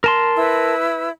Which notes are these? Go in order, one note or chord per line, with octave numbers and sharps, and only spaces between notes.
A#4 A5 C6
E4 B4 E6